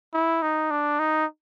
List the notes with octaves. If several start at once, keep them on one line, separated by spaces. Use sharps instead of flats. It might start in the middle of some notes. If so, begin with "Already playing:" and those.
E4
D#4
D4
D#4